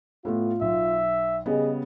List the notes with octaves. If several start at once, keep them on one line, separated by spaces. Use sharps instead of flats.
A2 A3 B3 F4
B1 E5
C#3 G3 B3 G#4 D#5